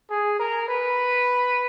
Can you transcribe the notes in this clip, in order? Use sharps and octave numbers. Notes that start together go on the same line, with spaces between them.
G#4
A#4
B4